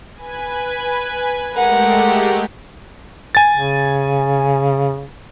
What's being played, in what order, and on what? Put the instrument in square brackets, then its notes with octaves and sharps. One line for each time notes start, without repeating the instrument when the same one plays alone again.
[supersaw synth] B4 G#5
[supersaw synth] G#3 A3 G4 [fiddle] A#4 F#5
[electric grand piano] G#5 A6
[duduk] C#3